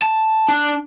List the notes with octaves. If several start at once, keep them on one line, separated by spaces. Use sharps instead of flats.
A5
D4